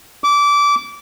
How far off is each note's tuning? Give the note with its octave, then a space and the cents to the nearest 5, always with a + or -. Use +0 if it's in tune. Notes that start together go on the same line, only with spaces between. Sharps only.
D6 -20